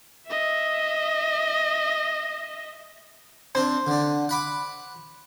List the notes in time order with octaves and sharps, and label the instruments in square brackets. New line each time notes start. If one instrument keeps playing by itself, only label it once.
[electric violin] D#5 E5
[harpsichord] C4 D4 [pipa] C5
[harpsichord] D3 D4
F#5 B5 D6